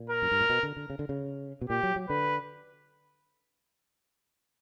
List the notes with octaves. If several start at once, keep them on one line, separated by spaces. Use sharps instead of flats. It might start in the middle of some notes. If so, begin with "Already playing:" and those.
Already playing: A#2
A#4
F#2
G2
A#2
B2
D3
D3
C#3
D3
C#3
B2
A#2 G4
F#3
F#3
D3 B4